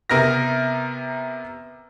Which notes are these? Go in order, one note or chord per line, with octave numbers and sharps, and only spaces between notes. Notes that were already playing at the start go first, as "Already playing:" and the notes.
C3 B3 A#4 F6 A#6